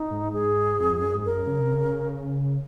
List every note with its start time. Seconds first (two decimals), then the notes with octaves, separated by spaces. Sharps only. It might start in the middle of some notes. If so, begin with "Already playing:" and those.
Already playing: D#4
0.11 G#2
0.33 G#4
0.80 F2
1.02 F#2
1.15 G#2
1.25 F#2 A#4
1.47 C#3
1.59 C3
1.72 C#3